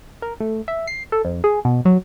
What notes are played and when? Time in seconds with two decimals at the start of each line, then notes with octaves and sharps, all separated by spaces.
0.22 A#4
0.40 A3
0.68 E5
0.87 C7
1.12 A4
1.25 F2
1.44 G#4
1.65 B2
1.85 F#3